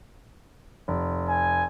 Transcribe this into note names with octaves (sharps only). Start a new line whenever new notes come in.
F1
G#5